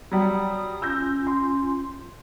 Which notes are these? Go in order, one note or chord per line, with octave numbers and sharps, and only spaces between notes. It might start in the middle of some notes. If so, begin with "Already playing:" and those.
F#3 G3 D#6
C#4 F4 E6 G6 A#6
C6